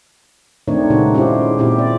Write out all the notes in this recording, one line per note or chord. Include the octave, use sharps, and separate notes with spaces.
D#3 A3 C4 D4 D#4 C#5
A#2 C#3 G#3 D#4 F#4
C#4 E4 F4 G4 C5
A#2 C4 E4 G4
D5